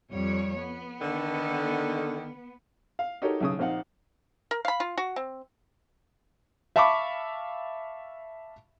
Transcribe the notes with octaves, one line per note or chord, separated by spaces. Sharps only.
F2 G3 C#5
B3
D3 D#3
F5
D#4 F#4 G4 A4 A#4 C#5
B1 C#3 D#6
A#1 C4 D#4 F5 F#5
A#4
F5 B5
F4
F#4
C4
E5 F5 A5 B5 C#6 D6